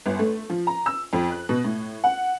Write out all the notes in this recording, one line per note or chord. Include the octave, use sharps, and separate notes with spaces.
G1
A3
F3
A#5
E6
F2
F#6
B2
A2
F#5